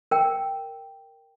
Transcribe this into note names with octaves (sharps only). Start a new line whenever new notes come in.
A#4 G5